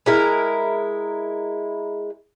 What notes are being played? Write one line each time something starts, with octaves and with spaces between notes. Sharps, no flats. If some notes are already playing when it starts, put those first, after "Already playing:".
G#3 E4 A#4